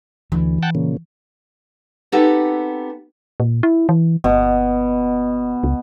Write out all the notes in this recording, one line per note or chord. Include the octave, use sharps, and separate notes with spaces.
D2 E3
F#5 G5 A5
A#2 C#3
B3 C4 D#4 G4 A4 F#5
A#2
E4
E3
G1 B2
C#2